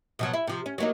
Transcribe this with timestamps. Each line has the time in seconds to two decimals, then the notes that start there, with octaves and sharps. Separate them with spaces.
0.19 B2 F3 F#3
0.33 E4
0.47 C3 F3
0.66 C#4
0.78 F#3 A#3 D#4